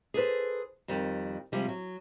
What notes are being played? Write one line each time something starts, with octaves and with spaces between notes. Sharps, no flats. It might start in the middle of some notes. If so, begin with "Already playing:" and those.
G#4 A4 B4 C5
F2 D#3 G3
C3 F3 G3 G#3
F#3